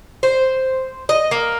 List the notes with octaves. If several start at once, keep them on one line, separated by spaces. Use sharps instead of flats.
C5
D#5
A#3